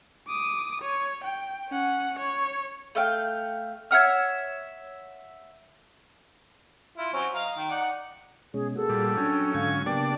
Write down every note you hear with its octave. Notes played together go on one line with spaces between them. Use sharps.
D6 D#6
C#5
G5
C#4 F#5
C#5
A3 F5 G5
C#5 E5 F#5 F6
E4 F4
F#3 C4 C#4
D#5 F5 A#5
D#3
D#4 D5 F#5
B2 G#3 C#4 G#4
A#3 F#4 G#4 A4
A#2 G3
F#3 C#4 D4 G5
G#2 D3 F5 G#6
C#3 A#3 B3 D4 G4 D5 G5